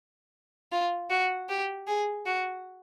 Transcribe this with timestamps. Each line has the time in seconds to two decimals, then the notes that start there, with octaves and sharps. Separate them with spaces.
0.72 F4
1.10 F#4
1.49 G4
1.87 G#4
2.26 F#4